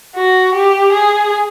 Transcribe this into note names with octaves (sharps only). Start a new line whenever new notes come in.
F#4
G4
G#4